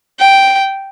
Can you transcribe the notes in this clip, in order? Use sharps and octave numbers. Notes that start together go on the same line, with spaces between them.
G5